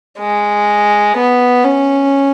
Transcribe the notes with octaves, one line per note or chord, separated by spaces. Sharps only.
G#3
B3
C#4